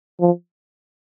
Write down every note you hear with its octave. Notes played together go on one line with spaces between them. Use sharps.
F3